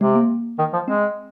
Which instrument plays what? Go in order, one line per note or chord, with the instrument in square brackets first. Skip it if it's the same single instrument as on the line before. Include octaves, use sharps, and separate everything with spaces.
[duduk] C3 [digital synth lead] G#3
[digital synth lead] A#3
[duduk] D#3
F3
[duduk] G#3 [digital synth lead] C4